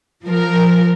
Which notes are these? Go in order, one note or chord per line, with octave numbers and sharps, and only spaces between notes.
F3 A#4